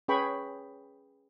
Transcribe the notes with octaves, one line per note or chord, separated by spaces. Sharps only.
C#4 G#4 B4 G5 B5 C#6